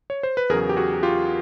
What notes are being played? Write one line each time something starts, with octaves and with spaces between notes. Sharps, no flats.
C#5
C5
B4
E2 C#3 F#3 G#4 A#4
G4
F#4 G#4
F4 G4